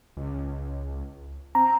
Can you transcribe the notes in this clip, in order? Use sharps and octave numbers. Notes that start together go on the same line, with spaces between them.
C#2
C4 A#5